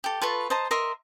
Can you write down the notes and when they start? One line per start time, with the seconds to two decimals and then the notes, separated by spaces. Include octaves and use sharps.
0.04 G4 A4
0.22 F4 A4 B4 C#6
0.50 C5 D#5 A5 A#5
0.71 A#4 D#5 E5 C6